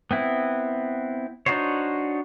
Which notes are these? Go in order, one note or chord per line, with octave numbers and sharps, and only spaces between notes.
B3 C4 E4
D4 D#4 F#4 C5 C#5